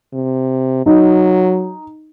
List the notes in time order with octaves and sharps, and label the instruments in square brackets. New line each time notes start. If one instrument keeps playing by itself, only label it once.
[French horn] C3
[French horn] F#3 [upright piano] D#4